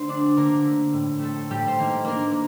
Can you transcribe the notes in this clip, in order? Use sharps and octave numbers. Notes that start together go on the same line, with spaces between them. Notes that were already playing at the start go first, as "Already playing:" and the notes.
Already playing: D3 A3 C5
C4 D4 D5
D3 A#3 A#4
A3
A2
A3 C4 A4
A2 G3 G4
C5
D#3 A#3 A#4
A#3 D4 A#4
A#3